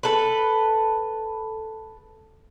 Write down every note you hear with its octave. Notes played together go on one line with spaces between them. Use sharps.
A4 B4